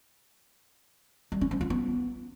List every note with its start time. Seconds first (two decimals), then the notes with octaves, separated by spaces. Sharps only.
1.32 G3
1.41 C#4
1.51 F3
1.61 F4
1.70 B3